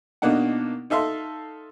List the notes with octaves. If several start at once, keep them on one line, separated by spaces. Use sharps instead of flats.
B2 A#3 D4 D#4 F#5
D#4 A4 E5 F5 C6